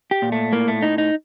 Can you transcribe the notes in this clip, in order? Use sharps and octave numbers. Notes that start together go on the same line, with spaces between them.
G4
A#2
A3
A2 A#3
A3
A2 D#4
D#4